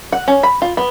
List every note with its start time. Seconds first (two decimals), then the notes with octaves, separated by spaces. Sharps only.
0.12 F#5
0.28 C#4
0.43 B5
0.62 F4
0.77 B3